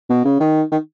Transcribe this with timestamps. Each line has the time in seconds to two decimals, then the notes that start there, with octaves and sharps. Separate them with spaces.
0.10 B2
0.25 C#3
0.40 D#3
0.72 D#3